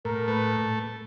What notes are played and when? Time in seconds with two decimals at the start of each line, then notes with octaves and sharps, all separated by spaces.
0.05 A2 A#4
0.28 A3 B4